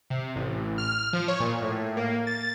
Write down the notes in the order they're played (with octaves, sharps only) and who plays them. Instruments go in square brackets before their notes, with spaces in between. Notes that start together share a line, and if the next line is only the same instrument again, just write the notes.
[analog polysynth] C3
A1
F6
F3
C#5
A#2
A2
A#3
A6